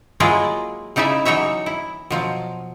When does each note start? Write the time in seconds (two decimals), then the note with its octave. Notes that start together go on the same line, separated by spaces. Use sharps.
0.20 F#3 G#3 A#3 E4 F4 G#4
0.96 C#3 D#4 E4 D5 E5
1.25 E3 F#3 D#4 C#5 E5
1.66 E4
2.11 B2 F3 F#3